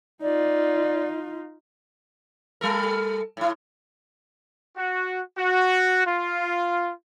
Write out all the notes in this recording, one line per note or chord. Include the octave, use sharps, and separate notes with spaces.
D#4 F4 D5
G3 A4 A#4
A2 E4
F#4
F#4
F4